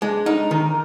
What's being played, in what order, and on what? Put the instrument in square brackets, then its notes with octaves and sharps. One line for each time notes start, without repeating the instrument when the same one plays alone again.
[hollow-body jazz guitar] G#3 [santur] D4
[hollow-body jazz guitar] D#4 [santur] A#4
[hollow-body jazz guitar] D#3 [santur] A#4